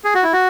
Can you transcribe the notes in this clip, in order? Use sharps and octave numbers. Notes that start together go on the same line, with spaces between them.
G#4
F#4
E4
F#4